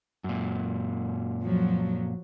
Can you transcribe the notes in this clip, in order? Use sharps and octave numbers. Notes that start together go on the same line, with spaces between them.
F#2 A#2
F3 F#3